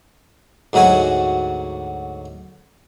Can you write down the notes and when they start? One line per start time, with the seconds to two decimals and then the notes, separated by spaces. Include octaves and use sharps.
0.73 D2 G#2 F#3 F#4 G#5